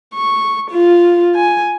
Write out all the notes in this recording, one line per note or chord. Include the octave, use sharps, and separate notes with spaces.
C#6
F4
G#5